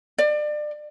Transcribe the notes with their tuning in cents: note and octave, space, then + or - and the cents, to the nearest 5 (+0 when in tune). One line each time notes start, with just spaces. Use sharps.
D5 +30